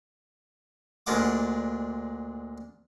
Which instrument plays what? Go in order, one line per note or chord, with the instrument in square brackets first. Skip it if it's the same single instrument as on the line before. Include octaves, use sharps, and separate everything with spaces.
[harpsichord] D2 A#2 G#3 D4 F#5 D6